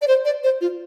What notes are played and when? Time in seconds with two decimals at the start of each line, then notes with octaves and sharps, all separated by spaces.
0.02 D5
0.08 C5
0.25 D5
0.44 C5
0.61 F4